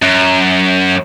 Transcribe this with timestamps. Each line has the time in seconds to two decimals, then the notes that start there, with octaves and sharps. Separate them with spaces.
0.02 F#2